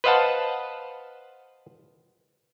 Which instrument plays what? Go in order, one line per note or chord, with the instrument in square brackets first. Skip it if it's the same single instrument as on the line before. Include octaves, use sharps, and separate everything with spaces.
[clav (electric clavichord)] B4 C5 D#5 F5 F#5 A5